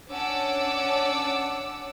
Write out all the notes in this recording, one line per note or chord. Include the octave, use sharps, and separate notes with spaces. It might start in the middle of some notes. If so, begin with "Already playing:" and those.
C#4 D4 F#5 A5 D6 E6